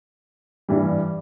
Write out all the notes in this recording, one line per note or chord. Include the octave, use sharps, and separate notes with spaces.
G2 E3 G3